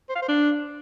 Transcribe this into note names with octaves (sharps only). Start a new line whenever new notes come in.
C5
F5
C5
D4